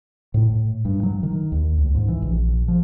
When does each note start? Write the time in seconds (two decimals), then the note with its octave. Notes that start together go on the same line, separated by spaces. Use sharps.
0.34 A2
0.85 G2
1.03 F#3
1.23 D#3
1.52 D#2
1.78 C#2
1.95 G#2
2.08 E3
2.22 A#1
2.68 F3